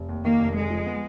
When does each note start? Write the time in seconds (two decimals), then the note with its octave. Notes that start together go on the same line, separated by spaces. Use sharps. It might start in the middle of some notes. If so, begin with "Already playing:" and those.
Already playing: F1
0.09 D#2
0.24 D#3 A#3
0.40 F1
0.55 D3 G#3
0.70 F3
0.86 B3